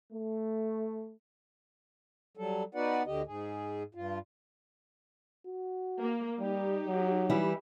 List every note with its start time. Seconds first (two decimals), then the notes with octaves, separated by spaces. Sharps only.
0.12 A3
2.37 F#3 G3 A4
2.75 B3 D#4 F#4 B4 D5 F#5
3.07 D2 D3 G4 D#5
3.26 G#2 G#4
3.95 G2 F4
5.46 F#4
6.00 A#3
6.39 G3 D#4 G4
6.87 F#3
7.30 E3 G3 E4